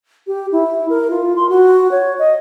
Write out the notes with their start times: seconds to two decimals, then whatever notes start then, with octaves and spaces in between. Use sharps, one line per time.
0.27 G4
0.52 E4
0.90 A#4
1.10 F4
1.36 C6
1.49 F#4
1.91 C#5
2.19 D#5